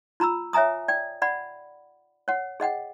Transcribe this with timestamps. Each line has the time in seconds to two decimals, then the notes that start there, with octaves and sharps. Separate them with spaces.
0.20 F4 A#5 B5 E6
0.53 C#5 E5 G#5 A#5 D#6
0.88 D5 G5
1.22 D5 F#5 B5
2.28 C#5 F#5
2.60 G#4 D#5 F#5 G5